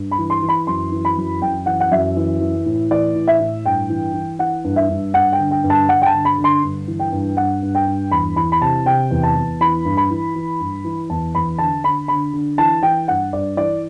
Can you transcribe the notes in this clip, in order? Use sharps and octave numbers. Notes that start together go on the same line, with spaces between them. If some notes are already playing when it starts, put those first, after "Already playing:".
Already playing: G2
B5
E3
C6
E3
B5
F#2 C6
E3
B5
F#2
F#2 G5
E3 F#5
F#5
F#2 E5
E3
E3
A2
E3 D5
A2
E5
A2
G2 G5
E3
E3
E3 F#5
G2
E5
G2
G2 F#5
G5
D3
G5
G2
A5
G2 F#5
G5
A5
D3
B5
D3
C6
G2
E3
G5
G2
G2 F#5
G2
G5
G2
E2 B5
E3 B5
B5
C3 A5
C3 G5
E2
A5
E2
E3 B5
G2
B5
E3
E3
G2
E3
E2 A5
E2 B5
D3 A5
D3 B5
D3 B5
D3
E3 A5
E3 G5
G2 F#5
G2 D5
E3 D5